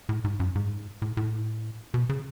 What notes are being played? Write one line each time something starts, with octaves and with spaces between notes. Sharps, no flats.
A2
G#2
F#2
G#2
A2
A2
B2
C#3